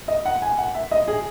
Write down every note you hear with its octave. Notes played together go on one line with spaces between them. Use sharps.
D#5
F#5
G#5
F#5
E5
D#5
G#4